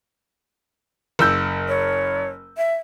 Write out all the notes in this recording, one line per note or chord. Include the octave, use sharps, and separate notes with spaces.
F#1 E6 G6
C#5
E5